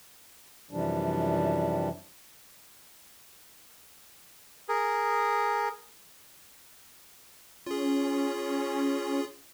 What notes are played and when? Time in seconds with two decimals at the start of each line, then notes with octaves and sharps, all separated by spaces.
0.71 F#2 C3 E3 F3 G3 D4
4.69 G#4 A#4
7.67 C#4 F4 G#4